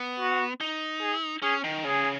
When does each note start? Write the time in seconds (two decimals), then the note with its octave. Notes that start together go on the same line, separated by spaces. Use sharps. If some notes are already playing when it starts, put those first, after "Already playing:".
Already playing: B3
0.20 F#4
0.61 D#4
1.01 G#4
1.42 C#4 G#4
1.64 D#3
1.85 C#3 G#4